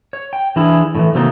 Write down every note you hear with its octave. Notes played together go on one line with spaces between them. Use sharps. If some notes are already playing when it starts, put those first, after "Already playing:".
C#5
G5
E3 D4 E4 G#4
A2 C#3 E3
C3 D#3 F#3 A3 A#3 D#4